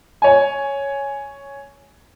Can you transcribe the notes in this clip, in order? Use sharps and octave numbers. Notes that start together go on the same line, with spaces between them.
C#5 G#5